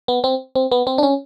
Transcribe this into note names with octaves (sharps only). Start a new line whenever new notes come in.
B3
C4
C4
B3
C4
D4
C#4